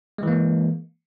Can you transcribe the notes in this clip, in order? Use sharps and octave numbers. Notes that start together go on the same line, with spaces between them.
E3 G#3 A#3